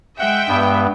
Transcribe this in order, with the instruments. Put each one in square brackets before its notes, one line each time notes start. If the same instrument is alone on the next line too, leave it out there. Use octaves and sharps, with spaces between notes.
[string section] G#3 E5 G5 [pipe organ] F#5
[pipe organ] G2 B3